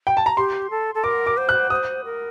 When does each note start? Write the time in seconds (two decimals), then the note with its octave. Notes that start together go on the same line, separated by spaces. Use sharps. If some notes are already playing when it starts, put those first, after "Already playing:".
0.07 G5
0.17 A5
0.26 A#5
0.36 G4 C6
0.70 A4
0.95 A4
1.04 A#4 D6
1.26 D6
1.37 C5
1.49 F#6
1.70 C5 D#6
2.05 A#4